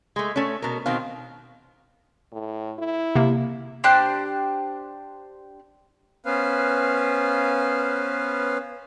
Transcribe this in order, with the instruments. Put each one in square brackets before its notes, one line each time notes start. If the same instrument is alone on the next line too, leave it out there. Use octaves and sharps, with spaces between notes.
[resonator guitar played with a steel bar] G#3 A3
A3 C#4
B2 A#4
B2 D#3 C4 F5
[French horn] A2
E4
[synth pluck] C3 A#3
[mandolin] D4 G4 C5 F#6
[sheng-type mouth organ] B3 C#4 B4 C5 F5